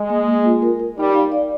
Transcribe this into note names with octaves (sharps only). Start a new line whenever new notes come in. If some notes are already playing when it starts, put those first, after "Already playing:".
Already playing: G#3
A#3
A#3
F4
A#4
A#4
G3 D#4
F5
D5